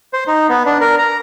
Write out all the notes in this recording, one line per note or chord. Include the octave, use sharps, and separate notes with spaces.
C5
D#4
B3
D4
A#4
A#5